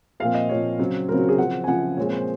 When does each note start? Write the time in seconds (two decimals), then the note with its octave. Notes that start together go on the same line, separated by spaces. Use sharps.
0.20 A#2 F3 C4 F5
0.34 D#5
0.49 A#2 F3 C4 C#5
0.79 C#3 F#3 C4
1.09 C#3 F#3 C4 A#4
1.18 F#4
1.29 G#4
1.38 C#3 F3 C4 F#5
1.64 G#5
1.67 C#3 F3 C4 F#5
1.97 A#2 F3 G#3 C4 C#5
2.13 C5